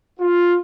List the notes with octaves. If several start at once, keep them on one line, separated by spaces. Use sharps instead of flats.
F4